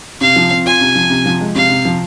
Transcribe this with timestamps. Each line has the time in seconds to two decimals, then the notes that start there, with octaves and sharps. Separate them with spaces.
0.21 C3 F5
0.36 F3
0.51 C4
0.66 F4 G#5
0.81 C3
0.95 F3
1.10 C3
1.26 F3
1.41 G#3
1.55 C3 F5
1.70 C3
1.85 F3